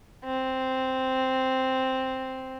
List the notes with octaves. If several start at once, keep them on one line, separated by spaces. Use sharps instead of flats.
C4